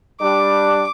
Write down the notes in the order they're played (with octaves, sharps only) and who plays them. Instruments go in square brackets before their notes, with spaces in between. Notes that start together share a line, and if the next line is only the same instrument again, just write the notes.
[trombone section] G3 D4 [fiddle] D6